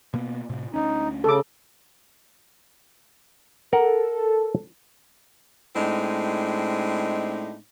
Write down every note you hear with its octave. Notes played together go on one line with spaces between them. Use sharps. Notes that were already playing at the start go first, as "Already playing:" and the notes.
B2 A#3 B3
A2 C3
D2 C#4 D#4
C#3 A4 D6
A4 A#4 F#5
A2 G#3 C4 D4 D#4